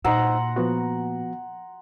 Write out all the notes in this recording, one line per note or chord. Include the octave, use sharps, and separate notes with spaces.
A#2 D#4 C5 F#5 A#5 C6 E6
F3 B3 F#4